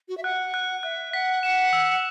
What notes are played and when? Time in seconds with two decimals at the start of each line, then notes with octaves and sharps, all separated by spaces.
0.09 F#4
0.17 E5
0.24 F#5 F#6
0.54 F#6
0.83 E5 F#6
1.13 F#5 B6
1.43 F#5 E7
1.73 E6